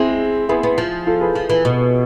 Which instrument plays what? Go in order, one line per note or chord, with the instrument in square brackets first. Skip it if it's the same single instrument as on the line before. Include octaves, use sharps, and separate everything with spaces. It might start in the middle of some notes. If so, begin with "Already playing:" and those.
Already playing: [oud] G#3 [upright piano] C4 E4
[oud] B3 [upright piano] E4 G#4
[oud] B3
F3
[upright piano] F4 A4
G#4 B4
[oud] F3
E3
B2